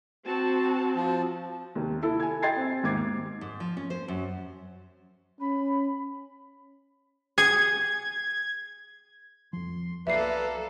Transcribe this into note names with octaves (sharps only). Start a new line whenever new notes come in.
C4 F#4 A5
F3
D#2 C3
E4 A4
G#5 G#6
D#5 G5 C6 G#6 A6 C7
C4
D#2 G#2 D6 G#6 A6 C7
G#2
F3
C#4
C5
F#2
C#4 B5
G#4 G#6
F2 F3 C6
B1 A#3 A4 B4 D5 E5 C7